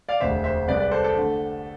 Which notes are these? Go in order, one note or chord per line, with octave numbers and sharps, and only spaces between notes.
D5 F5
E1 D2 C3 C5 E5
C5 E5
C2 C3 G#3 B4 D5
B4 D5
A4 C5
A4
D3 A3